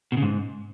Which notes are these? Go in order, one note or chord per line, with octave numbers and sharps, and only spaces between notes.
B2
C#3
G#2